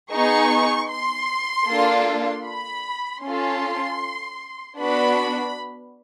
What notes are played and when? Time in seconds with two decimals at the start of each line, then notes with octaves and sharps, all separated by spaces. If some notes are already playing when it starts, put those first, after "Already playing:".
0.11 B3 D#4 G#4 C#6
0.90 C6
1.68 A#3 D4 F4 A4
2.46 B5
3.24 C#4 F4 A4 C6
4.80 B3 D4 F#4 B5